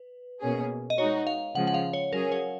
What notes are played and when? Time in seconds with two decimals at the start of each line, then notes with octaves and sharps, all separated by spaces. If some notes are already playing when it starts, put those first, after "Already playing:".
Already playing: B4
0.41 B2 A#3 C#4 G#4
0.90 D#5
0.98 G#3 D#4 F#4 C#5
1.27 F5
1.55 C#3 F3 G#3 F#5
1.67 F#5
1.74 F5
1.93 C#5
2.12 F#3 C#4 G#4 A#4
2.32 C#5